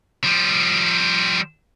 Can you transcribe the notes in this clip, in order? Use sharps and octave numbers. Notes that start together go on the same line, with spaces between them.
F3 G3